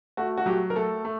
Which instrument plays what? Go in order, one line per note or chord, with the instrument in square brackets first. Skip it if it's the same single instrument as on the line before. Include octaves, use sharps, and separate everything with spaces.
[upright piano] A3 [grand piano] F#4
[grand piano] F#4
[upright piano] F#3 [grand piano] G4
[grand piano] A#4
[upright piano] A3 [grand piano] A4
[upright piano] A3